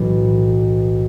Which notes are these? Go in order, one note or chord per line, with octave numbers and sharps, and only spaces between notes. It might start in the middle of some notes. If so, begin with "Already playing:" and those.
Already playing: B1 A2 E3